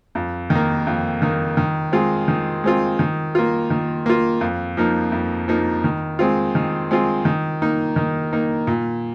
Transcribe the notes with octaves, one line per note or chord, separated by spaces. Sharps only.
F2
D#3
A#3
F2
D#3 A#3
D#3
G#3 C4 F4
D#3
G#3 C4 F4
D#3
A#3 F4
D#3
A#3 F4
F2
F3 A#3 D#4
F2
F3 A#3 D#4
D#3
G#3 C4 F4
D#3
G#3 C4 F4
D#3
A#3 D#4
D#3
A#3 D#4
A#2